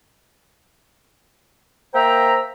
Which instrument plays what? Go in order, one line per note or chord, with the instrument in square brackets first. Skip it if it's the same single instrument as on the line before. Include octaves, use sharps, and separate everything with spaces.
[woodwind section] A#3 C5 E5 G5 A#5